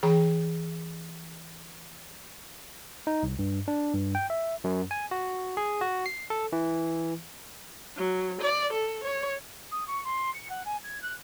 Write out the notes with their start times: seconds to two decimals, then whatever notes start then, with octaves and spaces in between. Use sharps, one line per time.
0.03 E3 G#4 G5 A#5 B5
3.07 D#4
3.23 C2
3.39 G2
3.68 D4
3.94 G2
4.15 G5
4.30 E5
4.64 F#2
4.91 G#5
5.11 F#4
5.57 G#4
5.81 F#4
6.06 C7
6.30 A4
6.52 E3
7.96 F#3
8.41 D5
8.73 A4
9.04 C#5
9.71 D#6
9.87 C#6
10.04 C6
10.34 C#7
10.49 F#5
10.65 G#5
10.84 G#6
11.02 F#6